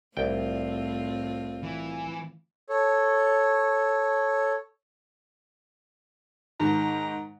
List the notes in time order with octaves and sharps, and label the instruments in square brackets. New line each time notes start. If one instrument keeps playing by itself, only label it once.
[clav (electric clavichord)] C2 G5 [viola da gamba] A2 C4 F4
[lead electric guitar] E3
[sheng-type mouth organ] A4 C#5
[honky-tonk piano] G#2 D#3 [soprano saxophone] A#5